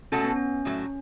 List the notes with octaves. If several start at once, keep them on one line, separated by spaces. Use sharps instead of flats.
B2 A3 C#4 F#4 A4
B3
C#4
A2 F#3 A3